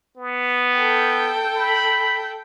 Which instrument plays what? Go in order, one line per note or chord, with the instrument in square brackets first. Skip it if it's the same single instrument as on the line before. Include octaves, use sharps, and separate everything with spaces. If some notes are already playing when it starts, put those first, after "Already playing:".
[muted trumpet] B3
[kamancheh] A4 G5
[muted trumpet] B5